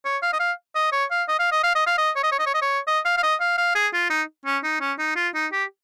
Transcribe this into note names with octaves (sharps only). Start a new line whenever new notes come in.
C#5
F5
D#5
F5
D#5
C#5
F5
D#5
F5
D#5
F5
D#5
F5
D#5
C#5
D#5
C#5
D#5
C#5
D#5
C#5
D#5
F5
F5
D#5
F5
F5
G#4
F4
D#4
C#4
D#4
C#4
D#4
F4
D#4
G4